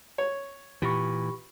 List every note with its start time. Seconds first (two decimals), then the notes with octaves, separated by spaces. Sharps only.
0.18 C#5
0.82 A#2 E3 G4 B5 C#6